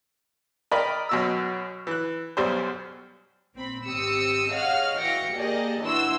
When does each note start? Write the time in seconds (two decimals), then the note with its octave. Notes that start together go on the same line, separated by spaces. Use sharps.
0.71 A#4 D5 D#5 G5 B5
1.09 F#2 B2 E6
1.87 E3 F#6
2.37 B1 F#2 G3 C5
3.54 A#1 C4 B5
3.87 G#1 C4 G4 D#6 E6 C#7
4.52 G#4 C#5 D#5 F5 F#5 F6
4.99 E3 F#4 F5 G5 A#6 C#7
5.34 A#3 G4 G#4 D5 D#5 A5
5.82 E3 D4 E4 F#4 C6 E6